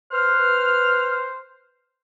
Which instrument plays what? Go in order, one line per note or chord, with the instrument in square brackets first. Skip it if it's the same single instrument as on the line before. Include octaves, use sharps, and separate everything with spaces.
[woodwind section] B4 F6 [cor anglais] C5